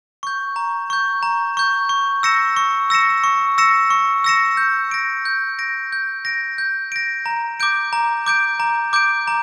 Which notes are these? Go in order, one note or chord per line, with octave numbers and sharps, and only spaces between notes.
C#6 G6
A#5
C#6 G6
A#5
C#6 G6
C#6
E6 A#6 C#7 E7
C#6
E6 A#6 C#7 E7
C#6
E6 A#6 C#7 E7
C#6
E6 A#6 C#7 E7
G6
A#6 D7
G6
A#6 D7
G6
A#6 D7
G6
A#6 D7
A#5
D6 G6 D7
A#5
D6 G6 D7
A#5
D6 G6 D7
A#5